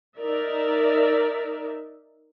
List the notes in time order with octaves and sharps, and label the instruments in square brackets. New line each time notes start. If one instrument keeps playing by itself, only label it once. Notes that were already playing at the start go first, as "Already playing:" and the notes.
[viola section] D#4 A#4 D5 E5